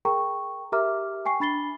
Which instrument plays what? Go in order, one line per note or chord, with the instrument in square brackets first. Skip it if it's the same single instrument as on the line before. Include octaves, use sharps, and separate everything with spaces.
[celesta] G#4 A#4 G5 A#5 C#6
G4 A#4 E5 A#5 D6 F6
G5 G#5 C#6 C7
D4 B5 A6 C7 G7